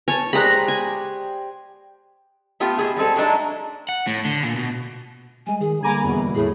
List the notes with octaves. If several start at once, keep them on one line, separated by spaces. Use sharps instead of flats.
C#5 G#5 A5
G#3 G4 G#4 C5 D5 A#5 B5 F#6
G#5
A3 B3 F4 G4
B2 G4 G#4
G3 G#3 C4 A4
F#3 G#3 A3 D4 D#4
F#5
A2
D3
A#2
B2
G3 G#3 G#5
D#3 G#4
D3 G3 A#3 G#5 A#5 B5 D6
E2 B2
A2 G#4